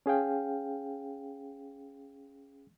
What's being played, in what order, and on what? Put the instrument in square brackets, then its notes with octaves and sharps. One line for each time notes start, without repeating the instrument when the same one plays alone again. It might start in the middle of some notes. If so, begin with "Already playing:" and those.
[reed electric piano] C#4 G#4 F5 G5